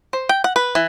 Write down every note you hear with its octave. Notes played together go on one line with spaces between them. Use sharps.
C5
G5
F#5
B4
E3